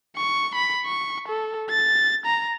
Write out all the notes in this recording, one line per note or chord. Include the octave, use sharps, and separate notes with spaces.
C#6
B5
C#6
A4
A6
A#5